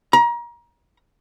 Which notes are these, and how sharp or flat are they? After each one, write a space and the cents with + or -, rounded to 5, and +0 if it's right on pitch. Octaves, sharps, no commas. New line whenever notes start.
A#5 +30